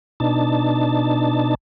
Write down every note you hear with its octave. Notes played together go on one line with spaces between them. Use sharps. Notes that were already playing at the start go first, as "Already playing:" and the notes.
B2 D4 D#4 A5